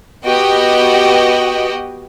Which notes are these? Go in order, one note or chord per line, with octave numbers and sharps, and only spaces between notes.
B3 F#4 G4 D#5 G5